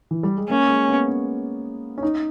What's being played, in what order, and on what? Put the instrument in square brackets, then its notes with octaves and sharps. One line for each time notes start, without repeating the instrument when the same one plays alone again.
[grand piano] E3
G3
G#3
[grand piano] A#3 [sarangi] C#4
[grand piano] G#3
B3
C#4
C#4
D#4